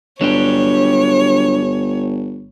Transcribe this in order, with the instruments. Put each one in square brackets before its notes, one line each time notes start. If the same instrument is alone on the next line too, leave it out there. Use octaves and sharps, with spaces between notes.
[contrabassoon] G1 [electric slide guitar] F#3 D4 G4 [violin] C#5